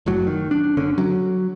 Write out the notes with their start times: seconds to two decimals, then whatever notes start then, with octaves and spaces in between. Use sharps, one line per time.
0.06 F#1 A2 F#3
0.27 D#3
0.51 D4
0.77 F#1 D3 C#4
0.98 F#3